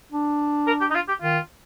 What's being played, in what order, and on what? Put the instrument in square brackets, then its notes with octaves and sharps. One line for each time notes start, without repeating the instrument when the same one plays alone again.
[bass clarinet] D4
[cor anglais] A#4
G4
D#4
F4
G4
[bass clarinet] D#3 [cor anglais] F4